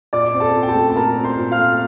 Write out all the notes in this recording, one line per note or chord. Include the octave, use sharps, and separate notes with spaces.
A#2 D5 D6
C4
A4 A5
A#2
G5
A4 A5
A3
A5
A#2 A#4 A#5
C4
C5 C6
A#2
F5 F6
A3